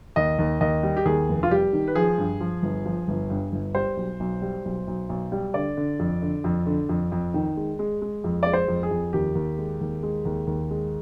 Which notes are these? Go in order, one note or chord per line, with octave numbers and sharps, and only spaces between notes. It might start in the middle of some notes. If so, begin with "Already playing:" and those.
D#2 D#5
D#2
D#2 D#5
G3
G4
D#2 G#4
F1
F4
G3 G4
D#3
B4
F3 G#4
G2
F3
G1
F3
G1
G2
G1
G3 C5
B1
B1
G3
B1
B1
B1
G3
D3 D5
D3
F2
D3
F2
D3
F2
F2
D#3
G#3
G#3
G#3
F2
G#3 D5
C5
F2
G#4
F2
D#2 G4
D#2
G#3
D#2
G#3
D#2
D#2
G#3